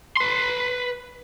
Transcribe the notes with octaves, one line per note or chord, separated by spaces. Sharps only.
B4 C6